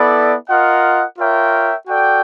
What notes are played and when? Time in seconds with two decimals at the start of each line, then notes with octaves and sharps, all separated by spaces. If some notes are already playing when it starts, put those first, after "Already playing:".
Already playing: B3 E4 A4 D5
0.48 F4 A#4 D#5 F#5
1.17 F4 A#4 C#5 E5 G5
1.87 F#4 A4 D5 G5